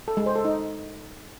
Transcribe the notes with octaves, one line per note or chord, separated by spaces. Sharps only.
A4
G#3
C5
A4
D#4